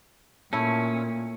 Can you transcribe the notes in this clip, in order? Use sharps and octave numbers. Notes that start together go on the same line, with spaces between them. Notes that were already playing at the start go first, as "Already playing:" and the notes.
A#2 A3 C#4 E4